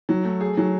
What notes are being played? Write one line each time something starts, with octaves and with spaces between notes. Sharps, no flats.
F#3
A3
G#4
F#3